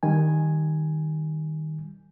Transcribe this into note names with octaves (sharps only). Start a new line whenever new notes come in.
D#3 G3 G#5